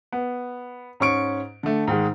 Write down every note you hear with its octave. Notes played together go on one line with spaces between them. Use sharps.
B3
G#2 C#4 C#6 D7
D3 A3
G#2 D#3 G#3